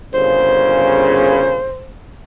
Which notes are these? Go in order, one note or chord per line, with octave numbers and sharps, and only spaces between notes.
G1 A#2 C#3 C5